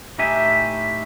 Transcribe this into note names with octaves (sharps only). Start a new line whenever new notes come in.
A2 D#4 G4 E5 G#5